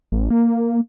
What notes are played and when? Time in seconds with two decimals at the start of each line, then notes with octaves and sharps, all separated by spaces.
0.12 A1
0.30 A#3